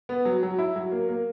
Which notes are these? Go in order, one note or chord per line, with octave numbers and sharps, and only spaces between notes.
B3
F#3
F#3
E4
F#3
A#3
A#3